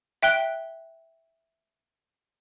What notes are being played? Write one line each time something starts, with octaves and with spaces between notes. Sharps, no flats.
E5 G5 F#6 G7